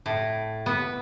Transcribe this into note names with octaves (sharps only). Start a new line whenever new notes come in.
A2
B3